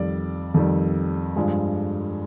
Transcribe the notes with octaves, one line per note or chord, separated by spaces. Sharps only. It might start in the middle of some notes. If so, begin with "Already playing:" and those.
Already playing: F2 D#3 G3 D5
F2 D#3 G3
G2 F3 G#3